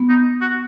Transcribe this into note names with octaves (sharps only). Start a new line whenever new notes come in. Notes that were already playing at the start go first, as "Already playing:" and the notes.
Already playing: B3
D#4
F#4